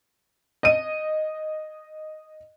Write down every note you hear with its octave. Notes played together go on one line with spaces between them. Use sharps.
D#5 D#7